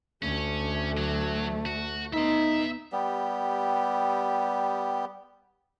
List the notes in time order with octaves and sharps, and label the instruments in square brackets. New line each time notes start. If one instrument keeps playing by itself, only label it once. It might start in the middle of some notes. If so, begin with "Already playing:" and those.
[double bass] D2 [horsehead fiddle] A3 [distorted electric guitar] C#4
[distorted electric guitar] F#3
F#4
[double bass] B3 [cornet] D#4 [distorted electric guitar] E5 C6
[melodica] G3 B3 G4